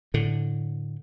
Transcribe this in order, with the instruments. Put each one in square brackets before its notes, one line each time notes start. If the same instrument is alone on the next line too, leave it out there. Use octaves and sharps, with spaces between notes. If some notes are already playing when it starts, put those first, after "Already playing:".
[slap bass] A2 D3